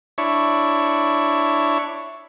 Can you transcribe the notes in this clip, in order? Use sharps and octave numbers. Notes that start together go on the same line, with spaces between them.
D4 E4 C#5 C#6